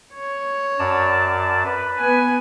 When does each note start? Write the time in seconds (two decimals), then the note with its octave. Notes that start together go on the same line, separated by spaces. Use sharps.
0.14 C#5
0.79 F#2 D5 A5
1.65 B4
1.98 B3 G#5